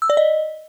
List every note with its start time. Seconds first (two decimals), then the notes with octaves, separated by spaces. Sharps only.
0.02 E6
0.10 D5
0.17 D#5